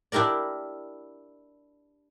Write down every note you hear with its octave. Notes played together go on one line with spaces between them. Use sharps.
D4 E4 G4 A#4 D5